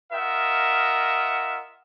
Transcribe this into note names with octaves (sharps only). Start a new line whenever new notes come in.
F4 A#4 D#5 E5 F#5